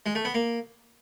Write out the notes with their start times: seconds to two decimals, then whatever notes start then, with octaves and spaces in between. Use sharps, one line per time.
0.06 G#3
0.15 A3
0.25 B3
0.34 A#3